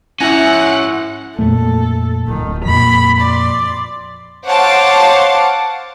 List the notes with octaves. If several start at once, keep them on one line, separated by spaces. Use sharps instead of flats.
C#4 E4 E5 F#5 G#5 A#6
F2 A#2 A3 A4
D1 D#3
F2 A#2 B5
D5 C6
C5 C#5 F5 F#5 A5 D6